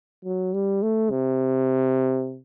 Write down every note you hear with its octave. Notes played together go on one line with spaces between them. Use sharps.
F#3
G3
A3
C3